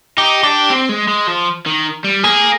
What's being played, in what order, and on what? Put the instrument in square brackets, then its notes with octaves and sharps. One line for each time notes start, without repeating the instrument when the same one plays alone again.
[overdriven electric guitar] D#4 [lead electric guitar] G4
[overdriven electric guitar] D4 [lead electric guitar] G4
[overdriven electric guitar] C4
G#3
G#3
F3
D#3
G3
[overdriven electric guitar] A#3 [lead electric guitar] G#4